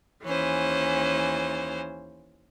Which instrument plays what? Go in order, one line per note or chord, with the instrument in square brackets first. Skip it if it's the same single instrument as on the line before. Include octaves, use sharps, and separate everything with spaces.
[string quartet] D#2 E3 C#4 C5